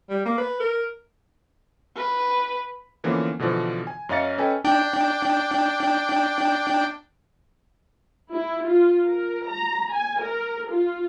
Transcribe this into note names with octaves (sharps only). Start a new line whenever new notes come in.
G3
A#3
B4
A#4
B4
D3 E3 F3 A#3 B3 C#4
B2 D3 E3 F3
G#5
F#2 C#4 D#5 F5 A6 C#7
C#4 A4 B4 D#5 G5 G#5
D4 G5
E4
F4
A#4
A#5
G#5
A#4
F4